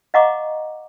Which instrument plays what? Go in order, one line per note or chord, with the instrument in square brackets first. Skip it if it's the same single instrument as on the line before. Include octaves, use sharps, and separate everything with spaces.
[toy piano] D#5 F5 F#5 A#5 C#6 D6